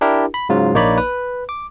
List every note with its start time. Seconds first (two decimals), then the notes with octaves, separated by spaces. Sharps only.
0.01 D4 E4 G4 A#4
0.34 B5
0.49 G#2 C#3 F#3 F4
0.74 A#1 A#3 D#4 C#5 D5 B5
0.98 B4
1.49 D6